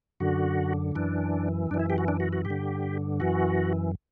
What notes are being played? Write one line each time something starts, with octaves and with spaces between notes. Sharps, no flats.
F#2 D3 F#4
F#2 E3 D4
F#2 E3 D4
E4
G4
F#4
D4
F#4
F#4
G2 G4
D3
F#2 E3 F#4